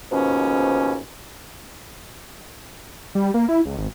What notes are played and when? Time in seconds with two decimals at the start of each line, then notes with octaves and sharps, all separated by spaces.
0.12 D#2 G#2 B2 F3 C#4
3.15 G3
3.34 A#3
3.48 E4
3.66 C#2
3.78 G#1